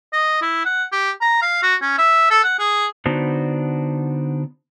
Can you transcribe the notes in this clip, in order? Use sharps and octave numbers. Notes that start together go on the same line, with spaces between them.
D#5
E4
F#5
G4
A#5
F5
F#4
C#4
E5
A4
F#5
G#4
D3 B3 D4 D#4 F#4 C5